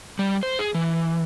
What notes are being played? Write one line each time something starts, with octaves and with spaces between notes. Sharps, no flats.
G3
C5
G#4
E3